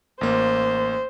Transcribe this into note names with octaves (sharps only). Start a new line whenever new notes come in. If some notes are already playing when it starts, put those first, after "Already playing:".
A1 A#3 C5